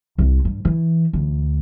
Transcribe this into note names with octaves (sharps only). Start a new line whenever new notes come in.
C2
G2
E3
D2